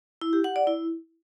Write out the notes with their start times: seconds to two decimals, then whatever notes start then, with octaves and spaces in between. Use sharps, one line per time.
0.22 E4
0.33 G4
0.44 F#5
0.56 D5
0.67 E4